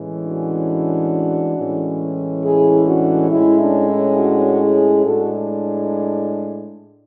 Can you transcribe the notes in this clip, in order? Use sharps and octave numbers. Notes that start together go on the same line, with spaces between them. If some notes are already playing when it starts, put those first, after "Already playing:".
Already playing: A2 E3 G#3 C#4
D4 F#4
A2 E3 G#3 C#4
E4 G#4
D4 F#4
A2 G#3 C#4 E4
D4
E4
D4 F#4
E4 G#4
A2 G#3 D4 F#4 A4